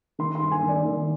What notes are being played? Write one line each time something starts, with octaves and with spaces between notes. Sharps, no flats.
D#3 C6
C6
G2
G#5
D#3
D5
D#3